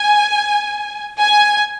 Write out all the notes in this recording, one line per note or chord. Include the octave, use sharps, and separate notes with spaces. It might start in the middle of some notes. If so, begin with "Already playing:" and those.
Already playing: G#5
G#5